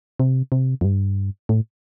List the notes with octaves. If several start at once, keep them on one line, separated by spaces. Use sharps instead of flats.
C3
C3
F2
G2
A2